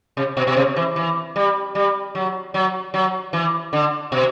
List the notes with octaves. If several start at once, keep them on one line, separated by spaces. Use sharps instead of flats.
C3
B2
B2
C3
E3
E3
G3
G3
F#3
F#3
F#3
E3
D3
B2